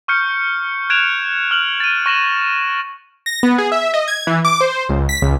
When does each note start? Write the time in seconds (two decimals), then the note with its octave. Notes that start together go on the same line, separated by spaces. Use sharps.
0.08 C#6 F6 G6 C#7
0.90 F#6 G#6 D7 E7 F7
1.51 F6 F#7
1.80 A6 D#7
2.06 C#6 A#6 E7 F#7
3.26 A#6
3.43 B3
3.58 G#4
3.72 E5
3.94 D#5
4.08 G#6
4.27 E3
4.45 D6
4.61 C5
4.89 C#2
5.09 B6
5.22 C#2